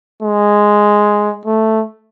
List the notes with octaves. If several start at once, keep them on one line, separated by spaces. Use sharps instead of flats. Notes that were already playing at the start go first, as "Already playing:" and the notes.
G#3
A3